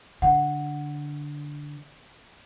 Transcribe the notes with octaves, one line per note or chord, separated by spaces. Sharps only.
D3 F#5